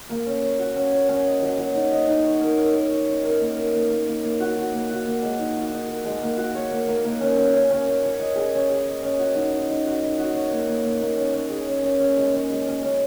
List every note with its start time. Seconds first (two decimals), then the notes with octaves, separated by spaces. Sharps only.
0.09 A#3
0.26 C#4
0.43 C#5
0.59 F#4
0.76 C#4
0.92 C#5
1.09 C#4
1.25 D#5
1.42 F#3
1.58 F#3
1.75 D#4
1.92 D#5
2.08 D#4
2.24 C#5
2.41 A#4
2.58 A#4
2.73 A#4
2.90 C#5
3.07 C#5
3.24 A#4
3.40 A#3
3.57 A#4
3.73 A#3
3.90 A#3
4.07 A#3
4.23 A#3
4.40 F#4
4.56 F#4
4.73 A#3
4.89 F#4
5.06 A#3
5.23 G#3
5.39 D#4
5.55 F#4
5.72 D#4
5.89 A#4
6.05 G#3
6.22 A#3
6.37 F#4
6.55 C#5
6.71 A#3
6.87 A#3
7.04 A#3
7.21 C#4
7.36 C#4
7.53 C#4
7.70 C#4
7.86 C#5
8.03 C#5
8.19 D#5
8.35 G#4
8.53 C#4
8.69 G#4
8.85 D#5
9.03 C#4
9.19 F#4
9.35 D#4
9.51 D#4
9.69 D#4
9.85 F#4
10.01 D#4
10.18 F#4
10.34 C#5
10.51 A#3
10.67 A#3
10.83 A#3
11.01 A#3
11.17 C#4
11.33 C#4
11.50 G#4
11.67 C#4
11.83 C#4
11.99 C#4
12.17 G#3
12.33 C#4
12.50 G#3
12.66 C#4
12.83 C#4